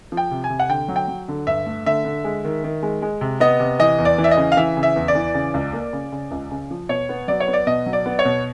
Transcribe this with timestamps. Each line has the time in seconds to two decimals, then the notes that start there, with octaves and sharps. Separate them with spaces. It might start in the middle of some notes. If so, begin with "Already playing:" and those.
0.12 F3
0.17 G5
0.31 C3
0.44 G#5
0.50 C3
0.60 F#5
0.69 D3 G5
0.88 F#3
0.96 G5
1.08 F#3
1.28 D3
1.47 G2 E5
1.66 A3
1.86 D3 E5
2.05 D3
2.24 G#3
2.45 D#3
2.64 D#3
2.83 G#3
3.02 G#3
3.21 C3
3.40 B3 D#5
3.60 C3
3.79 E3 D#5
3.99 E2
4.05 D5
4.18 E3
4.24 E5
4.31 D#5
4.37 C#3
4.52 F5
4.57 E3 E5
4.77 C#3
4.83 E5
4.96 E2
5.08 D5
5.15 E3
5.34 C#3
5.54 C#2
5.73 A#3
5.93 C#3
6.12 C#3
6.31 C#2
6.51 C#3
6.71 F3
6.89 B2 C#5
7.09 B3
7.28 F#3 D5
7.40 C#5
7.48 B3
7.53 D5
7.67 B2 D#5
7.86 F#3
7.93 D5
8.06 B3
8.19 C#5
8.25 B2